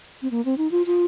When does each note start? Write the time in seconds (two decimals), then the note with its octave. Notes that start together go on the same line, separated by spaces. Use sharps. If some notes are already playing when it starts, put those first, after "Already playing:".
0.22 C4
0.31 A#3
0.45 C4
0.58 D#4
0.71 F4
0.86 F4